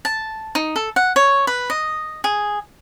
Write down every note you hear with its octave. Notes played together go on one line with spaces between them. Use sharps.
A5
D#4
A4
F#5
C#5
B4
D#5
G#4